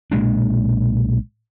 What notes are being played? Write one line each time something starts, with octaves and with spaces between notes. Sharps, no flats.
B1 A#2 G#3 D4